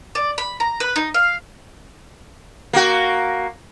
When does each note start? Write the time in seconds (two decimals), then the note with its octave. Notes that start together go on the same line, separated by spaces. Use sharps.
0.15 D5
0.38 B5
0.60 A#5
0.80 B4
0.96 D#4
1.14 F5
2.73 A#3 F#4